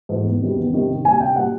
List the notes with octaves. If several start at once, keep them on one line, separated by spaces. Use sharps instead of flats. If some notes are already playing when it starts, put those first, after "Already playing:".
G#2 E3 A3
E2
C3 D#3 G3
E2
C3 D#3 G3
C2
A#2 G3 G#5
C2 G5
A#2 G3 F#5